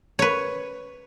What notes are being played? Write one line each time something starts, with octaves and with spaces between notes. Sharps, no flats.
B4 C#5